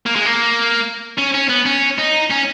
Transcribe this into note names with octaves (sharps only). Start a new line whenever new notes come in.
A#3
G#3
A#3
C#4
C#4
B3
C#4
D#4
C#4